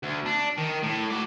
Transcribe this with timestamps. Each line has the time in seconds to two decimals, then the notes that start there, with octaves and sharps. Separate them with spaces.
0.03 D2
0.26 D4
0.58 D#3
0.83 A2
1.11 F#4 D5